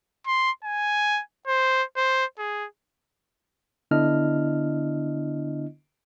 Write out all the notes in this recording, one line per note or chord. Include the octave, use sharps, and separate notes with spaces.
C6
G#5
C5
C5
G#4
D3 B3 D4 E4 D#5 F6